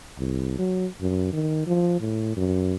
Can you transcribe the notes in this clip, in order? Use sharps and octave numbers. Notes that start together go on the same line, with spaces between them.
C2
F#3
F#2
D#3
F3
A2
F#2